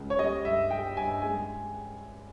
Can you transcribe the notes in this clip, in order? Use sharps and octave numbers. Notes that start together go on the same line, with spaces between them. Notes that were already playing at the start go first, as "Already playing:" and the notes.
Already playing: C#2
C#5
G3 D#5
G2 E5
G3 G5
G2 G#5
G#3 G#5